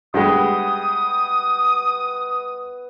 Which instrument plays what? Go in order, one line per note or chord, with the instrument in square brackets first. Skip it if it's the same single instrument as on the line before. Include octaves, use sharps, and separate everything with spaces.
[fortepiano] G2 G#3 [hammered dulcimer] B3 D#5 G5 [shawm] D#6